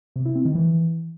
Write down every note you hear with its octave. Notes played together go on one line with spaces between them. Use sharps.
C3
E4
C4
D#3
E3